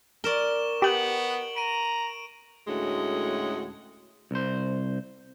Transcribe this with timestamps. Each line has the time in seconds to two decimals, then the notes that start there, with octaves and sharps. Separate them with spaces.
0.24 A#4 D5 C#6 E7 G7
0.82 B3 G4 G5 D7 F#7
1.56 A#5 D7 D#7
2.68 D2 A2 G#3 C#4 F#4
4.31 C2 C5